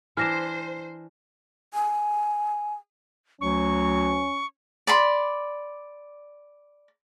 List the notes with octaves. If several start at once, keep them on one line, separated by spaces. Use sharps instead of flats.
E3 D4 C5 F6 A#6 E7
G#5
D2 F#3 C#4 C#6
D5 B5 C6